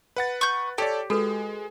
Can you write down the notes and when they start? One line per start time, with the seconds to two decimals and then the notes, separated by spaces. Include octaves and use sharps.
0.16 B4 F#5 A6
0.41 C#6 G6
0.78 G4 A4 C#5 D5 G5
1.10 G#3 F#4 A4 B4